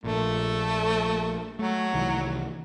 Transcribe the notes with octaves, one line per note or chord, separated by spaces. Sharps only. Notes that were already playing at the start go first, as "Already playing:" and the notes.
A#1 A#2 A3
F#3 A3
C2 D#3 E3